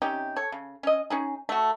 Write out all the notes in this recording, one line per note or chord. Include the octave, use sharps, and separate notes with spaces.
C3 C#4 D#4 G4
A4 C#5
C#3
C#4 D#5
C#4 D#4 G#4
A3 F#4